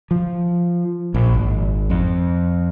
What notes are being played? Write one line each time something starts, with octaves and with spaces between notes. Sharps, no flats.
F3
A#1
G#1
F2